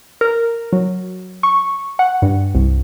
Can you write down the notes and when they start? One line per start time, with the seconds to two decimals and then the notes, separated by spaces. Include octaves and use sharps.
0.21 A#4
0.73 F#3
1.43 C#6
1.99 F#5
2.22 G2
2.55 C2